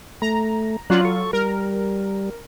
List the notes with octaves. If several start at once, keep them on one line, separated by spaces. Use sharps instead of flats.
A3 A#5
F#3 C#4 F4 D5 F#6
A4 C#6
G3 A#4